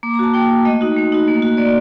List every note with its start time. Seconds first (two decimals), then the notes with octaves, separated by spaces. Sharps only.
0.03 A#3 D6
0.14 A#5
0.19 F#4 A5
0.34 A#3 G5
0.49 F#4
0.65 A3 D#5
0.81 D#4 F#4
0.96 A3
1.12 D#4 F#4
1.28 A#3
1.42 F#4
1.57 A#3 D5